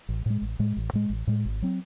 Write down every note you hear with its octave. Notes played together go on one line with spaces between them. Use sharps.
A1
A2 G#3
A1
A2 G#3
A1
A2 G#3
A1
A2 G#3
G#1
F#3 C4